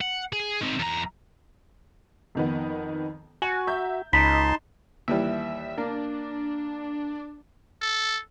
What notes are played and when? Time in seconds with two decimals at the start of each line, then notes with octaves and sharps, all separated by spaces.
0.01 F#5
0.33 G#4
0.61 D#3 C4
0.79 E2 A#5
2.35 F2 D#3 B3
3.42 F#4 G#5
3.67 E5 A#5 G6
4.13 C#2 D#4 D#5 A5 B5 C6 B6
5.08 D#2 E3 G3 E5
5.78 A#3 D4
7.82 A4